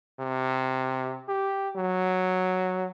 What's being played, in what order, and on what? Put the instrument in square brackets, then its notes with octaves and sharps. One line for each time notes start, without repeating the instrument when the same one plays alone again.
[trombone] C3
G4
F#3